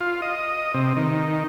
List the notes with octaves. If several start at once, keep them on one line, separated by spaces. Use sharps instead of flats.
F4
D#5
C3
D#3